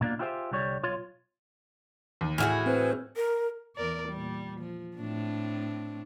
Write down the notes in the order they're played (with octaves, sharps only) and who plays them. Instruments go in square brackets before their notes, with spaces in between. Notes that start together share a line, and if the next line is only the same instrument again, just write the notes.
[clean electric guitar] B2 A#3 D4 F4
E4 F4 G4 G#4 C5 E5
C2 D3 G3 C#5
B1 F4 C#5 C6
[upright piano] D#2
[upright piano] A2 F6 [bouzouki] E3 F#4 G#4
[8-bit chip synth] C4 B4 C5
[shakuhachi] A#4
[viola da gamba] E2 A#4 D5
A#2 G3
F3
A2 C4 D4